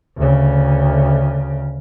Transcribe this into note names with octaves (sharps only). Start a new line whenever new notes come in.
D2 C#3